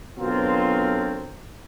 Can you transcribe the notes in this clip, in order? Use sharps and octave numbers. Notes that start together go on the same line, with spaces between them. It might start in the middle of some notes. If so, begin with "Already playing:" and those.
B2 D3 F#3 C4 F4 A#4